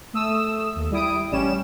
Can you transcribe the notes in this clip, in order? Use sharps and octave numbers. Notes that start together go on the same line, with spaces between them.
A3 D#6 E6
D#2
G3 E4 D#6 D7
A1 G3 C#4 E7